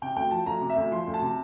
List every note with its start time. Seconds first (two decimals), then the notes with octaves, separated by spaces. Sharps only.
0.02 C3 G5
0.16 D2 G5
0.31 F3 A5
0.46 D2 A#5
0.61 C3
0.70 E5
0.76 D2
0.92 F3 C6
1.07 D2
1.14 A5
1.21 C3